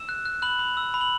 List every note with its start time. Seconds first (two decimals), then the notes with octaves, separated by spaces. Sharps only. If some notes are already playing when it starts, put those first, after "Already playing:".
Already playing: E6 E7
0.09 F#6
0.25 F#6
0.42 B5 F#6 F#7
0.59 B5
0.77 E6
0.94 B5
1.01 F#7